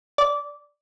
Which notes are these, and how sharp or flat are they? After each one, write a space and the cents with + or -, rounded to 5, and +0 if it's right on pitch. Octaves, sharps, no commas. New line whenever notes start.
D5 -15